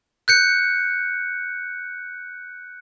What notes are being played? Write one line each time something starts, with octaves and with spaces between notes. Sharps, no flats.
F#6 G6 C#7